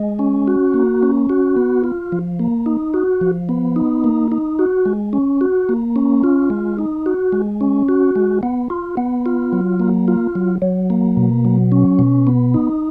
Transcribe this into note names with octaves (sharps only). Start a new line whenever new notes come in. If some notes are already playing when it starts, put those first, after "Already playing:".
Already playing: G#3
C#4
F#4
A#3
C#4
F#4
B3
F4
F3
A#3
D#4
F#4
F3
B3
D#4
A#3
D#4
F#4
G#3
C#4
F#4
A#3
C#4
F4
G#3
D#4
F#4
G#3
C#4
F#4
G#3
B3
F4
B3
F4
F#3
A#3
F4
F#3
F#3
A#3
B2
F#3
C#4
B2
B3
D#4